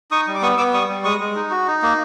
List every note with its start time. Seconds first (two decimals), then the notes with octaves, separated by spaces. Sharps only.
0.11 D#4 C#6 D#6
0.27 G3
0.35 D6
0.42 B3 C#6 D#6
0.58 B3 D6 E6
0.73 G3 C#6 D#6
0.89 G3
1.04 G#3 C#6 D#6
1.20 G#3
1.36 D#4
1.50 F#4
1.67 D#4
1.82 A#3